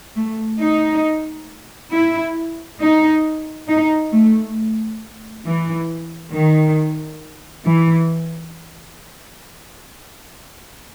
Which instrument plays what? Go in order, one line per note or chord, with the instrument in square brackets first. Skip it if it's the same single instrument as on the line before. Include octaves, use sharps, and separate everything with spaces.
[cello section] A3
D#4
E4
D#4
D#4
A3
E3
D#3
E3